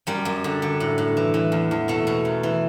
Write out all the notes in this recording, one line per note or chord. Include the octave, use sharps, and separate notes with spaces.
F#2 G3
F#2
D3
D3
A2
A2
E3
E3
E2
E2
B2 A3
B2
F#2
E3